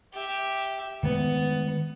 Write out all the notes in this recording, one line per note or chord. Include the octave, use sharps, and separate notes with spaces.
G4 E5
D#3 G#3 A3 B3